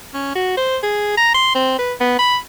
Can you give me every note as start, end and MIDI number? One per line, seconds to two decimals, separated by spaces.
0.14 0.34 61
0.36 0.55 66
0.57 0.77 72
0.83 1.15 68
1.17 1.30 82
1.34 1.51 84
1.55 1.77 60
1.79 1.94 71
2.01 2.17 59
2.19 2.37 83